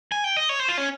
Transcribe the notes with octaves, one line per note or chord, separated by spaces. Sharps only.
G#5
G5
D#5
C#5
C5
F4
C#4